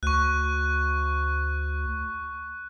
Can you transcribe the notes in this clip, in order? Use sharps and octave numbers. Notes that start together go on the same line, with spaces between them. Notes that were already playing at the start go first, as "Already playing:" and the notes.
D2 C#6 F#6